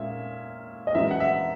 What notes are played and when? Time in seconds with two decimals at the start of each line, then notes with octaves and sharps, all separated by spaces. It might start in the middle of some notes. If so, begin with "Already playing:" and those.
Already playing: A#2 G#3 C#4 E5
0.87 D#5
0.95 F#2 E3 G#3 E5
1.11 F#5
1.20 E5